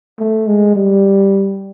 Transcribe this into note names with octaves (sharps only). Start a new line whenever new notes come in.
A3
G#3
G3